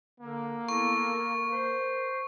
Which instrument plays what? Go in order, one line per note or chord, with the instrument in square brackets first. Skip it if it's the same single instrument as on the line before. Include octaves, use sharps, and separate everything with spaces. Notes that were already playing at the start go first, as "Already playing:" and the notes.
[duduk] D3 [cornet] A#3
[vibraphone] B3 E4 [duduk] A4 [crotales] C#6
[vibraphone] A#4
[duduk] C5